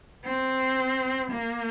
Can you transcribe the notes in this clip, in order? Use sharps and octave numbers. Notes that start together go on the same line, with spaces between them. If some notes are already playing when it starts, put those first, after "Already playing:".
C4
A#3